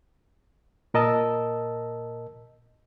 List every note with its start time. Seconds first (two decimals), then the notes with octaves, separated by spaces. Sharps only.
0.94 A#2 A#4 D#5 A5 E6